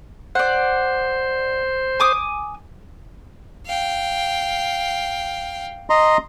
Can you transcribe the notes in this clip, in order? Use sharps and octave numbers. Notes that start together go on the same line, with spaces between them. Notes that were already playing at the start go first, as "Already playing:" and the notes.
C5 D5 F#5
G#5 D6 D#6
F5 G5
D#5 A#5 C6